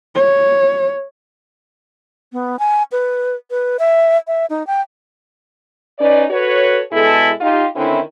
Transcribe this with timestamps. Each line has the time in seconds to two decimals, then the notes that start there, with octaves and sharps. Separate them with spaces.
0.15 C#5
2.33 B3
2.59 G#5
2.92 B4
3.51 B4
3.79 E5
4.27 E5
4.50 D#4
4.67 G5
5.99 C#4 D#4 B4 D5
6.30 F#4 A4 B4 C#5
6.92 B2 G#3 E4 G#4 A4
7.40 D#4 F4 G4
7.75 D3 D#3 C4 C#4 E4